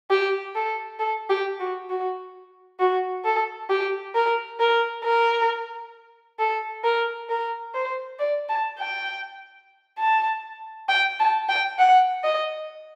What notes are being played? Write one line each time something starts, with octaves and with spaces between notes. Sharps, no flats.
G4
A4
A4
G4
F#4
F#4
F#4
A4
G4
A#4
A#4
A#4
A4
A#4
A#4
C5
D5
A5
G5
A5
G5
A5
G5
F#5
D#5